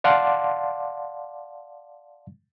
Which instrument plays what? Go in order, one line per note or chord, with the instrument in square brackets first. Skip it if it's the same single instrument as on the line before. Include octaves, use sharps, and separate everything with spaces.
[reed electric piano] D5 F5 F#5 A5 C6 D6